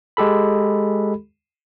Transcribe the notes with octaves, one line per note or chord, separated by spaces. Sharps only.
G#3 G4 A4 B5